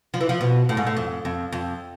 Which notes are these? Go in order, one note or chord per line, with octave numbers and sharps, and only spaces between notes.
F3
E3
F3
B2
A2
G#2
A2
F2
F2
F2